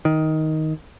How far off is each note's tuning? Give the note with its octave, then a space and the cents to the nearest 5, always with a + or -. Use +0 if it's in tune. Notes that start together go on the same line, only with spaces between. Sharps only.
D#3 +10